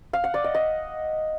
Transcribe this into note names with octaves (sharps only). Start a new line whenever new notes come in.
F5
F#5
D5
D#5
D#5